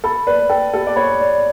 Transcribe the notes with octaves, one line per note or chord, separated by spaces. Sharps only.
A4 B5
B4 D5
A4 G5
G4 A4
D5
C#5 B5
D5